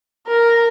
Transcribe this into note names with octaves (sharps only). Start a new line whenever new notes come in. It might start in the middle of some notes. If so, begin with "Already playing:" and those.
A#4